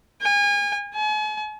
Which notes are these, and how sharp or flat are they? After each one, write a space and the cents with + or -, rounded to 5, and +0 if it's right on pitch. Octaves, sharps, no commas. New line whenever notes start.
G#5 -35
G#5 +45